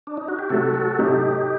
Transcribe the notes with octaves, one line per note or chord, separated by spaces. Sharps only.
D4
D#4
F#4
G4
C3 F#3 A3 F#4 A4
F#4 A4
C3 F#3 A3 D#4 G4